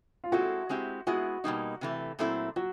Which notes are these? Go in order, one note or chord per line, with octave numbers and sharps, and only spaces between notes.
F4
G#3 C4 E4 F#4 A4
G#3 C4 E4 G4
G#3 B3 E4 F#4 G#4
B2 G3 A#3 D#4
C3 E3 A3
A#2 F#3 A3 C4 E4
F#3 F#4